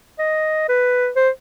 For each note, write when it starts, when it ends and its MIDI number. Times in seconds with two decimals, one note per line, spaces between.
0.19 0.66 75
0.69 1.09 71
1.16 1.30 72